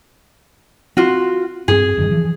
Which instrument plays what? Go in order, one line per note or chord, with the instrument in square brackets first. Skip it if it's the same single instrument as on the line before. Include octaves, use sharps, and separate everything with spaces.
[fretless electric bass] C4 [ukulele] F4 F#4
[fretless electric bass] G2 C4 [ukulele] G#4
[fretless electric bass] E1 G2 D#3
E3 F3